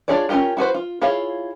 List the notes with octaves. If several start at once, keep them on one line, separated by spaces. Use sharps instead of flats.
D4 F4 G#4 C#5 D5
C#4 E4 F4 G4 A#4
E4 F#4 B4 C5
F4
E4 F4 G#4 C#5 F5